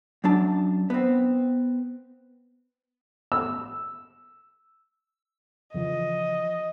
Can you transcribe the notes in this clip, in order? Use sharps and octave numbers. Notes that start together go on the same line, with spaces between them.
F#2 F#3 D4 A5
B3 C4
E6
C#3 E3 F3 D#5